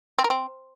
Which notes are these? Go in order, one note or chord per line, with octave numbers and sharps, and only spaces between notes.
C4
A#4
C4